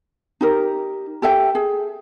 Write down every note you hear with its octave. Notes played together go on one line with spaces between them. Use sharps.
D#4 G4 A#4
G4 A4 E5 G5
G#4